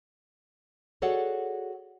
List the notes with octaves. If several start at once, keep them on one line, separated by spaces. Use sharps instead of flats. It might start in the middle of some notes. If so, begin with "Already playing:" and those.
F#4 G#4 A4 C#5 D5 F#5